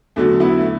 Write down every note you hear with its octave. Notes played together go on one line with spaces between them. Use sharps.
E2 D3 F#3 A3
B3 E4
A3